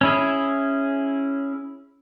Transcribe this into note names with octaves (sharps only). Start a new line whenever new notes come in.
C#4 E4 G#4